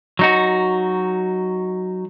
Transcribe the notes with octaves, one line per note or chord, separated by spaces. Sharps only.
F#3 D#4 F#4